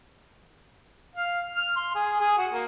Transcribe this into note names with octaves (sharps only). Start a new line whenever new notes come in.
F5
F6
C6
G#4
G#4
F#4
A#3